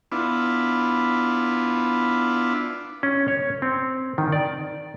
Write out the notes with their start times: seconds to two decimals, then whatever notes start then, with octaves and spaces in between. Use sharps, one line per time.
0.12 B3 D4 E4 F4
3.03 C#4
3.28 C#5
3.62 C4
4.18 D#3
4.32 D5